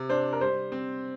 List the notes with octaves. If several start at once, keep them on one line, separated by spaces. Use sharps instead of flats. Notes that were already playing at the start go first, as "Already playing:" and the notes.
Already playing: C3
D4 C5
A#4
G3 C5
C4